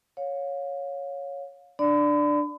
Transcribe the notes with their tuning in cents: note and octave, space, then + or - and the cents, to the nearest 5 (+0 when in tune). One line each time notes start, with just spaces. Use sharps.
C#5 +0 F5 +30
D4 +15 D5 +0 B5 +40